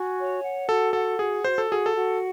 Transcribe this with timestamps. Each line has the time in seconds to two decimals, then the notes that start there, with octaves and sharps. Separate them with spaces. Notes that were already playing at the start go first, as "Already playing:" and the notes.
Already playing: F#4 G#5
0.18 C#5
0.44 F#5
0.68 F#4 A4
0.93 A4 F#5
1.19 F#4 G#4
1.44 F#4 C5
1.58 A4
1.69 F#4 G#4
1.86 A4
1.94 F#4